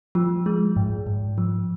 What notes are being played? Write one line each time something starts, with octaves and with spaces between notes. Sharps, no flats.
F3
G#3
G#2
G#2
F3